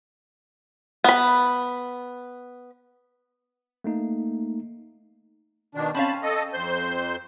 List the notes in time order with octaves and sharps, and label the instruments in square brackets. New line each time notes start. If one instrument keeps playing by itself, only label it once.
[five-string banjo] B3 B5
[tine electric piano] A3 A#3 D#4
[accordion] B2 D#3 D4
[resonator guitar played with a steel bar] C4 C#4 F5 [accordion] A5 B5
[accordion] A4 D#5
F2 C5 G6